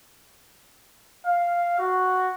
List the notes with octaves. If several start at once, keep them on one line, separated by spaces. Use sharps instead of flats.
F5
F#4